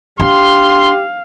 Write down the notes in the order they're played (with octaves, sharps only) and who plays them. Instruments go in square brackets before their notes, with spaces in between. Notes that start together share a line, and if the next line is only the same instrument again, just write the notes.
[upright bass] D4 [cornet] G4 [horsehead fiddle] F5 [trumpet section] C6